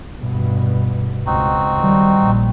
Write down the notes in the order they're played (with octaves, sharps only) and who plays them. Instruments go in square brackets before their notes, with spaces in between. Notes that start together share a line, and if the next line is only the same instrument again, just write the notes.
[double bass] G2 B2
[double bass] C#2 [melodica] C4 D#4 F#4
[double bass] D#3 G3
A#1